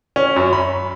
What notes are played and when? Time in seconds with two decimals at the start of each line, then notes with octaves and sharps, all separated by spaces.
0.16 C#4
0.36 F#2
0.53 B5